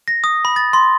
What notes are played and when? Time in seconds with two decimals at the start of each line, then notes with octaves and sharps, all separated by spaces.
0.08 A#6
0.24 D#6
0.45 B5
0.56 A6
0.73 C6